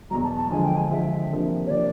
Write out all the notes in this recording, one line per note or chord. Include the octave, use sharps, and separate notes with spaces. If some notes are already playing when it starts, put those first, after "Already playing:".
E2 B2 F#3 A#5
A5
A5
D3 F3 G#3 G#5
G5
G#5
D3 F3 G#3 E5
C3 F3 A#3 D4
C#5
C3 F3 A#3 D4 D5